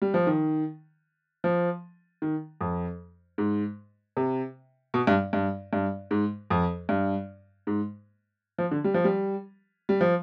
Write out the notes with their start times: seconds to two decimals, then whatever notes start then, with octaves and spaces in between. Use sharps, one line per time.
0.02 G3
0.14 F3
0.27 D#3
1.44 F3
2.22 D#3
2.61 F2
3.38 G#2
4.17 C3
4.94 B2
5.07 G2
5.33 G2
5.73 G2
6.11 G#2
6.50 F2
6.89 G2
7.67 G#2
8.58 F3
8.71 D3
8.84 G3
8.94 F3
9.05 G3
9.89 G3
10.01 F3